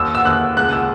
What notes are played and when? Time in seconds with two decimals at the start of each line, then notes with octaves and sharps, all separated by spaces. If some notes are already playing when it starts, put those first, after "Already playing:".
Already playing: D#2 E6
0.15 E6
0.25 D#2 F#6
0.57 C#2 F#6
0.73 E6